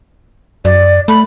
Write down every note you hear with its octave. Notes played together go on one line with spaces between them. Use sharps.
F#2 D5
A3 B5